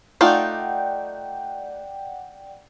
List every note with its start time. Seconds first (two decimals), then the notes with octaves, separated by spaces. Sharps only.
0.21 A3 D#4 F4 D5 F#5 G5